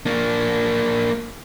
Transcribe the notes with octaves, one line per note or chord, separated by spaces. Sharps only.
A#3 D4